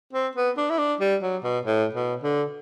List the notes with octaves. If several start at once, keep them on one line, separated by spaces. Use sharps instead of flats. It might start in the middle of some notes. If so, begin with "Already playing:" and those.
C4
B3
D4
E4
D4
G3
F#3
B2
A2
B2
D3